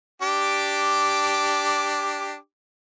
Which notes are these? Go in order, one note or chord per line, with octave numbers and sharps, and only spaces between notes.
D4 G4 D6